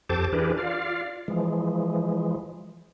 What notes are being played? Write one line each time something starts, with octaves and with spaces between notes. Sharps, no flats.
F2 G4 A4 C5 A5 D6
E3 D4 G4 G#4 A#4 B4
F4 D5 F5
E3 F3 G#3